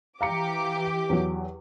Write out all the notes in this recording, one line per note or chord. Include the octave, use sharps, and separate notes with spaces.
E3 G4 F5 A#5 D6 C#7
E2 F#3